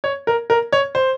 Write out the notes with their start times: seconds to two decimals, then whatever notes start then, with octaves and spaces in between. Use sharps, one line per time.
0.04 C#5
0.27 A#4
0.50 A#4
0.72 C#5
0.95 C5